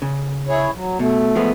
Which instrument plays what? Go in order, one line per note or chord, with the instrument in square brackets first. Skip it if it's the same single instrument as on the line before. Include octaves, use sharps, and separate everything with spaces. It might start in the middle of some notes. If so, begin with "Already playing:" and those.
[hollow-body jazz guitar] C#3
[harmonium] E4 G#4 C#5
F#3
[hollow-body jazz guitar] B2 [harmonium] A3
[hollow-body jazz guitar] F3 G#3 B3